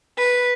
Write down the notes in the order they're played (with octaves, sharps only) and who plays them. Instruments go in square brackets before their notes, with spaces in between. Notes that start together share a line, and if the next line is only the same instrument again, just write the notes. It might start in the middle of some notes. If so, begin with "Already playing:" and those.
[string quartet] B4